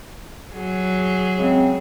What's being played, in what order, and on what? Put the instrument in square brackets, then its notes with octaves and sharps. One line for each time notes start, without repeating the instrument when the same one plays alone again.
[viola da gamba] F#3 G#4
[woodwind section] C#3 G#3 C4